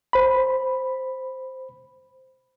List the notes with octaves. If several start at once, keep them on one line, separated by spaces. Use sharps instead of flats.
C5 B5